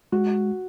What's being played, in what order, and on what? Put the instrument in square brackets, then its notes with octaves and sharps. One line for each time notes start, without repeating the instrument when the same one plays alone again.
[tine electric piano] G#3 [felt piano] F#4